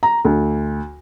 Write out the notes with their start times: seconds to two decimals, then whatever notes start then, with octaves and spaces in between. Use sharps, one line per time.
0.03 A#5
0.25 D2